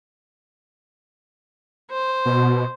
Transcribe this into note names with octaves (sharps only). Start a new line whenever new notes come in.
C5
B2